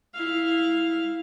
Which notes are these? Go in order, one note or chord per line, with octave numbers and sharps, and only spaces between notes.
E4 F5